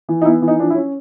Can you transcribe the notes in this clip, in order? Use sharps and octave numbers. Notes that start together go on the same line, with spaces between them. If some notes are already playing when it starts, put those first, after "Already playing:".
E3
D#4
B3 E4
E3
D#4
F3 D4
E4
C#4